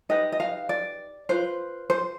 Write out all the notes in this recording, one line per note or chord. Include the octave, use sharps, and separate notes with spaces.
D#4 G4 B4 D#5
D#5
F5
D5
F4 B4 C5
C5